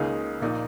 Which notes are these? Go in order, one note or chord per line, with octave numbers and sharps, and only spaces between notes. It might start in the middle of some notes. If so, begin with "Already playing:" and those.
Already playing: C#2 C#3 A#3 D#4 G#4
A#1 A#2 A#3 D#4